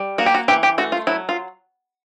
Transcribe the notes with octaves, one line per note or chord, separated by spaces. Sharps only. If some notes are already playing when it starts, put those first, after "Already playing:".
Already playing: G3
A#3 F#4
G4
F#4
E3 G4
G4
A3 F#4
F4
F#3 E4
F4